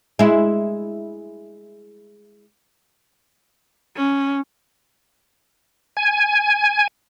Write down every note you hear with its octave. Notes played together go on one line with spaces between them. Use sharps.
G#3 E4
C#4
G#5